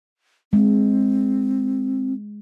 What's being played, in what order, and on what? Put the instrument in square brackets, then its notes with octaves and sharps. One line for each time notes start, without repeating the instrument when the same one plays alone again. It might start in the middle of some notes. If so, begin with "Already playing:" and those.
[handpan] G#3 [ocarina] C4